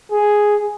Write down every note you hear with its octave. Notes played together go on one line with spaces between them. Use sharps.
G#4